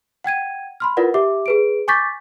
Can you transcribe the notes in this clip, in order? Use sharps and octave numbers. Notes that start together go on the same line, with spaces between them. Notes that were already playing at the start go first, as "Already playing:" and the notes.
F#5 G5 G#6 D#7
B5 C6 F6
E4 F4 A#4 B4 D5 F#5
G4 E5 D6
G#4 B4 D7
G#5 C#6 D6 G6 A6 B6